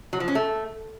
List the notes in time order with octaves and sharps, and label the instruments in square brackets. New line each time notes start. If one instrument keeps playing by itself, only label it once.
[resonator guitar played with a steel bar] F#3
F3
C#4
A3